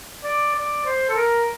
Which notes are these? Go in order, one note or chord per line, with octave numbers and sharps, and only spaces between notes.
D5
D5
C5
A4
A#4